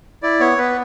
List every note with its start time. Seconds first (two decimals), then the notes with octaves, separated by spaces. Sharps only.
0.23 E4 D5
0.40 B3 C#5
0.58 B3 B4